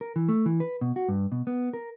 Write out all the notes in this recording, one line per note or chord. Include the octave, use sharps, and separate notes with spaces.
A#4
E3
A3
E3
B4
B2
F#4
G2
B2
B3
A#4